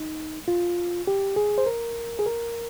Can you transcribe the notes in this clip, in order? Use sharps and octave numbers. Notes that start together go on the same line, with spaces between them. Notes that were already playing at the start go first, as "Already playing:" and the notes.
Already playing: D#4
F4
G4
G#4
C5
A#4
G#4
A#4